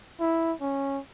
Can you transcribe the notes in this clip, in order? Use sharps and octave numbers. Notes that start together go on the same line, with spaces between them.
E4
C#4